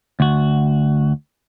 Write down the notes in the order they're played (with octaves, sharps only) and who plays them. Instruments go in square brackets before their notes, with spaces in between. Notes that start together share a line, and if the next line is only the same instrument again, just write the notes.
[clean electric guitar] D2 F#4